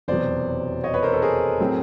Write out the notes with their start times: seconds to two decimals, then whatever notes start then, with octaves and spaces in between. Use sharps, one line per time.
0.08 F1 E2 B2 F#3 C5 D5
0.84 C#5 D#5
0.94 B4 C#5
1.03 A#4 C5
1.12 A4 B4
1.22 G#4 A#4
1.60 A2 F#3 A3 C4